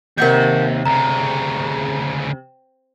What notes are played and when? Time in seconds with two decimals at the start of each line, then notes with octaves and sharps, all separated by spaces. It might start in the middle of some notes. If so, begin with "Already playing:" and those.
0.18 D#2 C3 G4 A#4 F#5 C#6 G6
0.85 D2 C#3 A#5